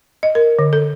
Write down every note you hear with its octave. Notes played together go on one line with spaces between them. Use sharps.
D#5
A#4
D3
A4